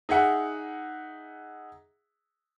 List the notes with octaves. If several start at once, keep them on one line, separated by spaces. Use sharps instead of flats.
D#4 G#4 E5 F#5